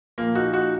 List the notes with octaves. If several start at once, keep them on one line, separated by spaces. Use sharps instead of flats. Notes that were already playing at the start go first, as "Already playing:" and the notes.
A#2 F3 A#3
D#4 F#4
D#4 F#4